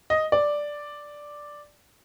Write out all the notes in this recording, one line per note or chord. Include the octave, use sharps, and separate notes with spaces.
D#5
D5